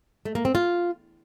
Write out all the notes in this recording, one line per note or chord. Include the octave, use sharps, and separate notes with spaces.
A3
A#3
C4
F4